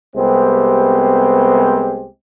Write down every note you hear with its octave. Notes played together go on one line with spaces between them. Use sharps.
C2 G#3 B3 C4 G4 C5